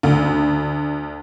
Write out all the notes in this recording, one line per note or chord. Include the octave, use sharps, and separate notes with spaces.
D2